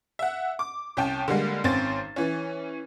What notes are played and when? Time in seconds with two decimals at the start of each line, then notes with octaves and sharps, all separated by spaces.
0.19 E5 F#5
0.59 D6
0.97 C2 C#4 G5 A5
1.28 D3 G3 G#3 A#3
1.64 G#1 C4 C#4 A6
2.16 E3 C#4